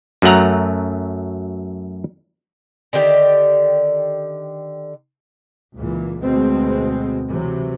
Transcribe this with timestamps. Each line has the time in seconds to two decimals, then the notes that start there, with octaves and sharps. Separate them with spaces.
0.22 F#2 F#3 A3 F#5 A#5
2.93 D3 D#3 G4 D5
5.74 C#2 A#2 E3
6.21 D2 B2 G#3 C4
7.28 C3 E3 F#3